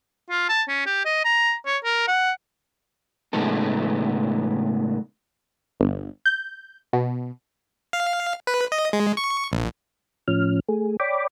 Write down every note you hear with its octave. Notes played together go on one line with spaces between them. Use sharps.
F4
A5
C#4
G4
D#5
A#5
C#5
A#4
F#5
A2 C#3 G#3 B3 D#4 A4
G1
G6
B2
F5
B4
D#5
G#3
C#6
A#1
A2 F3 C#4 F6
A3 G#4
C#5 D5 G5 B5 D6